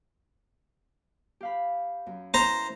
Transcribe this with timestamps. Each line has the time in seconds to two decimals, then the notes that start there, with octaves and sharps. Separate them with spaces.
1.41 G4 F5 B5
2.06 F#2
2.34 E4 A#4 C5 A#5